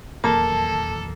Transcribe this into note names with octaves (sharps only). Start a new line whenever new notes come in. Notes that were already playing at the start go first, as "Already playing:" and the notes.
D#1 E2 F#3 A#3 A4 A5